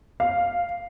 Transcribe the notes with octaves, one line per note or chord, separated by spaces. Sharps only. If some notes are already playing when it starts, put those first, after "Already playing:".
F5